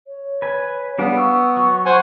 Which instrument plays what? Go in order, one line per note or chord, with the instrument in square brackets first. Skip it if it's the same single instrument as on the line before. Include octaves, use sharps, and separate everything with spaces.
[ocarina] C#5
[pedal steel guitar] B4 G#5
[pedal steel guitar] G3 D4 G#4 [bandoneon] B3 [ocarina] F5
[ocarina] C#6 [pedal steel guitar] E6
[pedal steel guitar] F#3
[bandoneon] C5 F#5 G#5